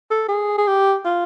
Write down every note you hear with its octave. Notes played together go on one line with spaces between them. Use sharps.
A4
G#4
G#4
G4
F4